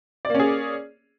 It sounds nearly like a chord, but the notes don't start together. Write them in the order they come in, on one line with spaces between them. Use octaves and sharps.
D5 A#3 C#4 G#4